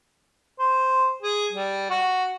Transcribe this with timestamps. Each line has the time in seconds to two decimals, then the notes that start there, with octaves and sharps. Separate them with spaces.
0.59 C5
1.23 G#4
1.53 G3
1.90 F#4